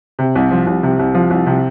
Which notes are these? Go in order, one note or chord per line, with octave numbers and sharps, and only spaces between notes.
C3
C2
F3
C2
C3
C2
F3
C2
C3